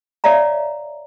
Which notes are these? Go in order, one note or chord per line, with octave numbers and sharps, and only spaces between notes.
C#5 D5 E5 F5 A#5